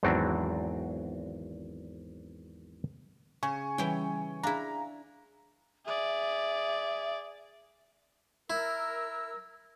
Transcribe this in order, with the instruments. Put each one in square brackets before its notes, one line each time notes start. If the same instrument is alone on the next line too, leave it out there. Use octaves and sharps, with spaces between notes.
[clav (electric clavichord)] G#1 E2 F#3 C4 D4
[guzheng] C#3 [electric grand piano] G#5 C#6
[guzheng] E3 C#5 G5 [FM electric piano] G3 C#4
[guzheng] D4 E4 [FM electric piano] G#4 F5 G#5 [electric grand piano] A#5
[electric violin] G#4 D5 [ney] E5
[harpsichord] E4 [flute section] A#4 E6